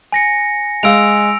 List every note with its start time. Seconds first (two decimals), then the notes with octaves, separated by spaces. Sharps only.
0.12 G#5 A#6 C#7
0.83 G#3 F5 E6 D7 F7